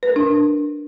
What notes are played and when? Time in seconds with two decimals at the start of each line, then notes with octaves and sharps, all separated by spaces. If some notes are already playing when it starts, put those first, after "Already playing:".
0.03 B4
0.09 A#4
0.16 D4